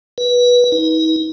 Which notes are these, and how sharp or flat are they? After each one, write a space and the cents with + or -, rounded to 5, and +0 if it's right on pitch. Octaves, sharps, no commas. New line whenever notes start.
B4 -20
D#4 +45